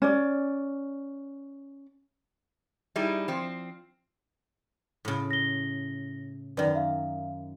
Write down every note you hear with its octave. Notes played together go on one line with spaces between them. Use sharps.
C#4 D5
G3 D#4 E4 G#4
F3 C4
A2 C#3
A#6 G7
F#2 D#3 B4 D5
E5 F5